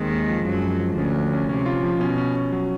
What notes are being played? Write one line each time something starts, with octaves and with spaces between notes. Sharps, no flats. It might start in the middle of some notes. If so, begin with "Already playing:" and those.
Already playing: D#2 D#3 G#3 C4
G#3
F3
F#2 F3 F#3
F3
F3
D2 D3 C#4
F3
C#4
C3 C#4
F4
F3
B2 C#4
C#4
C#4
F#3